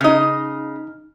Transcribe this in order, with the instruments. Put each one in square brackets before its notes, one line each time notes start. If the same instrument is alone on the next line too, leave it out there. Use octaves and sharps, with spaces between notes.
[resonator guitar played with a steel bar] C#3 D#5 [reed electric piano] D#4 F6